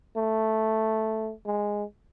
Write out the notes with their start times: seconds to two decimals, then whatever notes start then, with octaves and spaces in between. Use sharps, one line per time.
0.16 A3
1.46 G#3